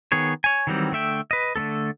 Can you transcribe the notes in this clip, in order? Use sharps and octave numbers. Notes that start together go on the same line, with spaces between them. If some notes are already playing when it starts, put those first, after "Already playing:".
D#3 B3 G#4 C#5
C#5 G#5
D#3 E3 F#3 G3 C4
D3 A3 E5 G5
B4 D#5
D3 A3 B3 A4